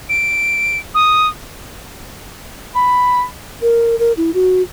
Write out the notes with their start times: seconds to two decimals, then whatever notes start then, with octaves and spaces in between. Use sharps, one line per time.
0.09 D7
0.95 D#6
2.75 B5
3.62 A#4
3.99 A#4
4.17 E4
4.34 F#4